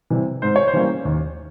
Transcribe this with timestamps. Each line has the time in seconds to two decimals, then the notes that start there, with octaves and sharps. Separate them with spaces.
0.10 C3 E3 G3
0.42 G#2 C5
0.56 C#5
0.68 C5
0.73 E3 G3 A#3 C#4
1.05 D#2